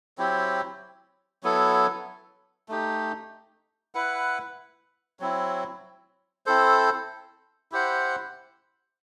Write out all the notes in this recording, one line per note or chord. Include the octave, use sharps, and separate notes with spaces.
F#3 C4 E4 G4
F#3 B3 E4 A4
A3 D#4 G4
E4 B4 F#5
F#3 C4 E4
C4 E4 A4 C5
E4 G4 C5 F#5